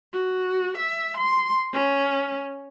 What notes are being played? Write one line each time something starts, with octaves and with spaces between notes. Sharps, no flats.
F#4
E5
C6
C#4